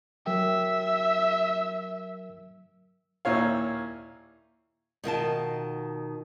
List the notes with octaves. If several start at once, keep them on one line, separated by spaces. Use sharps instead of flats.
F#3 A#4 E5 G5
D#2 A#2 E4 C#5 F5
B2 D#3 F4 A5